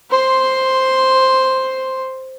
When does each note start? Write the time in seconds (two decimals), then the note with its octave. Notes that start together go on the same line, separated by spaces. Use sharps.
0.10 C5 C6